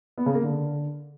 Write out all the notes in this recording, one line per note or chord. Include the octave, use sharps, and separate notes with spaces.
B3
C#3
A#3
D3